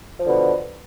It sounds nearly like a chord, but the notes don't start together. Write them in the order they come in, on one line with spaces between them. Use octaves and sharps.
F3 D3 B2